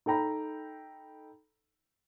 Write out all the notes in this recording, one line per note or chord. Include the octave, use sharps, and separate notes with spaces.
D#4 A4 G5 A#5 B5